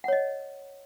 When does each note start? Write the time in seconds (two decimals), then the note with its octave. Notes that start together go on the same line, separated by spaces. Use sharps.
0.04 F#5
0.08 C#5
0.13 D#5